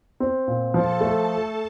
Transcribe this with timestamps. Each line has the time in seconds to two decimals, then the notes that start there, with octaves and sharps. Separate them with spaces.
0.20 C4
0.48 A#2
0.74 F3 A4 A5
1.01 A3